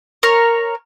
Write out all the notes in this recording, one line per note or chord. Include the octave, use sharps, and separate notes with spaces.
A#4 C#5